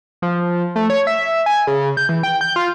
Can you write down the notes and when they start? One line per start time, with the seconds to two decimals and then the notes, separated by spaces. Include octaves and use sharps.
0.22 F3
0.76 A3
0.90 C#5
1.07 E5
1.46 G#5
1.67 C#3
1.97 G6
2.09 E3
2.23 G5
2.41 G6
2.56 F4